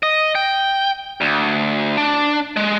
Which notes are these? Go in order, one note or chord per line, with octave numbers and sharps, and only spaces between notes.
D#5
G5
D2
D4
G#3